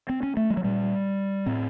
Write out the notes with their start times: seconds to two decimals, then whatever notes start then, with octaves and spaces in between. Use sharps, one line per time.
0.09 C4
0.23 C#4
0.37 A3
0.50 G3
0.57 F#3
0.64 A#2 G3
1.46 A2 C4